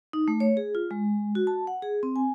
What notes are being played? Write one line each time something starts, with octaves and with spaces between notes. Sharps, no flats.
D#4
A3
C#5
G#4
F4
G#3
F#4
A5
F#5
G#4
C4
G#5